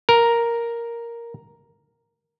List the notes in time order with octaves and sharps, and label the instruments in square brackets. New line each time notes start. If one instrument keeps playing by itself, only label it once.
[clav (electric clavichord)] A#4